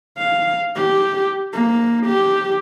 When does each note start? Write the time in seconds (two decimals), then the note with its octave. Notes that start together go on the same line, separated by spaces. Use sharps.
0.18 F5
0.75 G4
1.53 A#3
2.06 G4